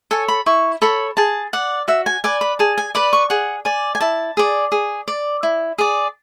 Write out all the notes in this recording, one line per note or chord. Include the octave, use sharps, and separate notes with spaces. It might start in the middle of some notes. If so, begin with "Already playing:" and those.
A4 C#5 G#5
B5
E4 C#6
A4 C#5 B5
G#4 A5
D5 F#5
F#4 E5
G#5
B4 D5 G#5
B5
G#4 A5
G#5
B4 D5 B5
C#6
G#4 F#5
D5 G#5
G#5
E4 A5
G#4 D5
G#4
D5
E4
G#4 D5